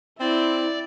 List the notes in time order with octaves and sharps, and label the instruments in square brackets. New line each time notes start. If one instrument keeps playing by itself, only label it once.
[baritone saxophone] C4 [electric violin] E4 [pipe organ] D5